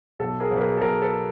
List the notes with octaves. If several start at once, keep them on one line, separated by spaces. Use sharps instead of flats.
B1 A4
G#4 A#4
B1
B4
G#4 A#4
A4
B1 G#4 A#4
A4 B4